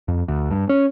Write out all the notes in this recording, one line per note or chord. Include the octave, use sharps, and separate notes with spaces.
F2
D2
G2
C#4